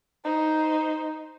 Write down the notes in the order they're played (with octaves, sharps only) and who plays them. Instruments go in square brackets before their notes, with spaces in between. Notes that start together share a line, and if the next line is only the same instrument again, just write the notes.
[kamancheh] D#4 C5